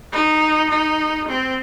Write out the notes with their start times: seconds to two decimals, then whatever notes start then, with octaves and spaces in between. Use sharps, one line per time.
0.12 D#4
0.69 D#4
1.28 C4